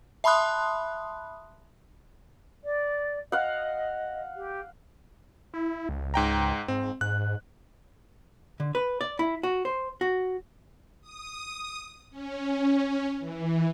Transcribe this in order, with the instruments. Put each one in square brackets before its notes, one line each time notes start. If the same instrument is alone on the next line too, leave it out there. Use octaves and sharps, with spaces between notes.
[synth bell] E5 A5 B5 C6 D#6 F#6
[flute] D5
[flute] D#5 [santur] F5 F#5
[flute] G4
[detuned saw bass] E4
C#2
[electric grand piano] G#2 G5 A#5
[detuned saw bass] G#2 [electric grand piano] C4
[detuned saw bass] G#2 [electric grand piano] F#6
[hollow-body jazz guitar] D3
B4
D5
E4
F#4
C5
F#4
[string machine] D#6
C#4
E3